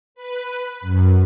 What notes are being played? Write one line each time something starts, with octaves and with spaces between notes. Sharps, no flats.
B4
F#2